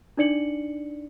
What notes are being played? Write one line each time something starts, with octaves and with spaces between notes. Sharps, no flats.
D4 D#4 D5 C#7 F#7